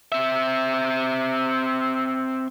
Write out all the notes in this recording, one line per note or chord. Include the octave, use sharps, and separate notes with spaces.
C4 E5